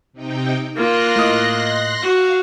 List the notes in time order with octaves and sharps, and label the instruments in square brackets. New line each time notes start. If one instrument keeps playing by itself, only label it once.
[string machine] C3 D#4 G5
[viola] A#3 F4 [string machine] C6 F#6 A#6
[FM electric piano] A2 D#5
[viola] F#4 [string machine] F5